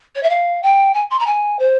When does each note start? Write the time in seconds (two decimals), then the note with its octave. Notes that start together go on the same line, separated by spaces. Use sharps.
0.15 C#5
0.23 E5
0.29 F5
0.62 G5
0.94 G#5
1.10 C6
1.19 A#5
1.26 G#5
1.59 C5